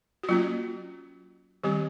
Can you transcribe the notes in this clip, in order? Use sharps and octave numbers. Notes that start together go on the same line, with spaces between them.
F#4
F#3 A#3 C#4 F4
D#3 G3 C4 G4